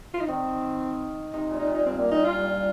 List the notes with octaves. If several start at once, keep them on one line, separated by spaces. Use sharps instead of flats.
F4
D#4
D#3 C4
C3 D#4
A#2
D#4
A#2
D#4
G2 C4
A#3
A#2 D#4
F4
G2